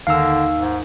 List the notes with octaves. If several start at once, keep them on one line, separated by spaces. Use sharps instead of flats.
D#2 D3 F5 A#5 E6
G#2